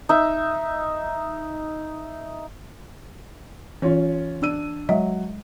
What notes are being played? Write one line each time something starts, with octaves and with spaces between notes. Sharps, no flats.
D#4 E5
E3 C#4 F4
D4 E6 D#7
F#3 G#3 D#5 E5